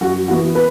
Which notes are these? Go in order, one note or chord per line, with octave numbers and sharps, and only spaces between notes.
F#2 F#4
E3 B3 F#4
B4